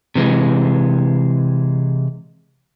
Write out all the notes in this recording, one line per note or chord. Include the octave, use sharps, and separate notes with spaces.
C3 E3 G#3